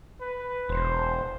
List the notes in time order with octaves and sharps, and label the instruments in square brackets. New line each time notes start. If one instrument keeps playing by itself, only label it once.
[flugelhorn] B4
[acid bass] E1 [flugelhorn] C5